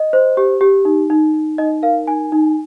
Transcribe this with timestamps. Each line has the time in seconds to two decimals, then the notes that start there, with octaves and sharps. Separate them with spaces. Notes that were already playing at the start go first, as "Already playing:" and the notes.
Already playing: D#5
0.13 C5
0.37 G4
0.61 G4
0.85 D#4
1.10 D#4
1.34 D#4
1.58 D#4 D#5
1.83 A#4 F5
2.07 D#4 G#5
2.32 D#4